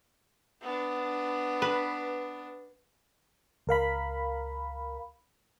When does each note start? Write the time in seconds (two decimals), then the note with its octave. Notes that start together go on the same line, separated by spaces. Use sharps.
0.62 B3 D4
1.62 B4
3.67 C#2 A#4 F5 B5